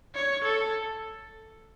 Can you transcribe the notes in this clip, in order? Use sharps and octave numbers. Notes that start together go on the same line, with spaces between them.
C#5
A4